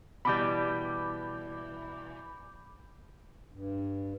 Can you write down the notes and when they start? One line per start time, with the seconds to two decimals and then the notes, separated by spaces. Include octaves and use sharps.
0.25 B2 E3 G3 B5 D6 G6
3.51 G2